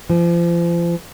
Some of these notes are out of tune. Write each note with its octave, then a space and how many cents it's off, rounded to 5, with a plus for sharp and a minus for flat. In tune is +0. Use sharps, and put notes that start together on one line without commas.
F3 -35